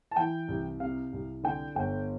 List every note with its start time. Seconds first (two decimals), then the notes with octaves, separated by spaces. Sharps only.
0.11 A5
0.16 E3 G5
0.48 C2
0.80 C3 F5
1.13 C2
1.43 D3 G5
1.76 G1 G5